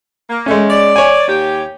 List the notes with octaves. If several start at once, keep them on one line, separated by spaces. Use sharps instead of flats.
A#3
G#3 A3 C#4
D5
C#5 G#5
D#2 G4